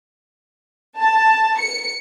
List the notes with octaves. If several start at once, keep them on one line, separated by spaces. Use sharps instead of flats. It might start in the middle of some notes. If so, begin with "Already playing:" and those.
A5
C#7